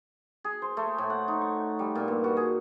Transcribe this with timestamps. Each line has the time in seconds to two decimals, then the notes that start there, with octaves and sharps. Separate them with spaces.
0.44 G#4
0.62 C5
0.77 A3
0.98 A2
1.10 F#5
1.28 D#4
1.42 C#6
1.79 G3
1.95 A#2
2.08 G2
2.24 F#4
2.37 G#4